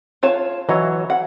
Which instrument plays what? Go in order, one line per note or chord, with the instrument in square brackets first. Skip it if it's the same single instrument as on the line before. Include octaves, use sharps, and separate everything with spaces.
[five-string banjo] F4 C#5 A5
[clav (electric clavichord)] E3 F#3 C#5 [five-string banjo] D#5
[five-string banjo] F#5